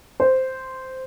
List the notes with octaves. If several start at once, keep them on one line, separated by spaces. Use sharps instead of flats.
C5